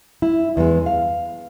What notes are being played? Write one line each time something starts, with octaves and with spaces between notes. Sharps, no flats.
E4
E2 G#3
F5